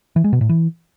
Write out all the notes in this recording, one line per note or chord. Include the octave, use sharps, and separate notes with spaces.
E3
G#3
B2
A2
E3